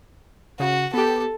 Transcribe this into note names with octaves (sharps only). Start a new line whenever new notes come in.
C#3 F#4
B3 G4 A4